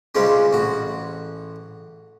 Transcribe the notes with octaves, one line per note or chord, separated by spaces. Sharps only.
C#2 C#3 G3 G#3 C4 C#4
A1 F#4